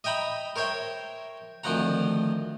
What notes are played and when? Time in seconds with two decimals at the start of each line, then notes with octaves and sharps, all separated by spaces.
0.04 D#5 E5 G5 A#5 B5
0.56 A#4 C5 C#5 E5 G5
1.64 D2 D#3 F3 C4 F#5 A#5